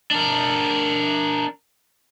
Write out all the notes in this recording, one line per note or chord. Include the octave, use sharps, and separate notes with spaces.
D4 A#4